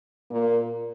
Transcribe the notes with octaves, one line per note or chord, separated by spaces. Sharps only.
A#2 A#3